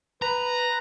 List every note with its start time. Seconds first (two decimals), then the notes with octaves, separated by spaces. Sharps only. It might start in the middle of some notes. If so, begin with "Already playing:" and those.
0.22 B4 A#5